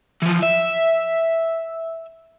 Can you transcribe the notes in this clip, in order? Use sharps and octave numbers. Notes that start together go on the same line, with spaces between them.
E3 F3
E5